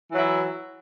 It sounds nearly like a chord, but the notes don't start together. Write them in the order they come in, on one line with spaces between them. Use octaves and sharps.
E3 F#3 E4